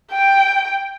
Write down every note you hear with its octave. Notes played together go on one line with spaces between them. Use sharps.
G5